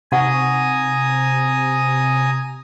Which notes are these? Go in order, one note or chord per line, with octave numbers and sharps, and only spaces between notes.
C3 D#4 F#5 G#5 A#5 C#6 D#6